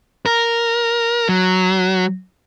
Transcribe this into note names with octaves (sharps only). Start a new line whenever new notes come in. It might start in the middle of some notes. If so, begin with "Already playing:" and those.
A#4
F#3